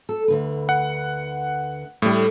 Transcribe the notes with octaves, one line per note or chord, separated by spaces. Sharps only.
A4
D2 D3 B4
F#5
A2 G3 A3 D4